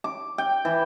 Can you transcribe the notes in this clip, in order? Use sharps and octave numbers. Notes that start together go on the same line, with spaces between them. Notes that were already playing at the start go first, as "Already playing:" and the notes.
D6
G5
E3